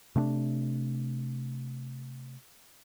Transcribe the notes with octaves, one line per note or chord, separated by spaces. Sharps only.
C3 A3 C4 D4